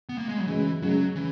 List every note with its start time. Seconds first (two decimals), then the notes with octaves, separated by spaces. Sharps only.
0.09 B3
0.18 A#3
0.29 G#3
0.38 F#3
0.47 F#2 C#3 E3 G#3
0.81 F#2 C#3 F#3 G#3
1.15 C#3 E3